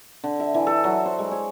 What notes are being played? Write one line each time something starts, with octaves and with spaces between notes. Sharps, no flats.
D3
E5
E3
A4
F#3
C5
G#3
C#5